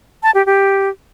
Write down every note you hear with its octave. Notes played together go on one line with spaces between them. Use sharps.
A5
G4
G4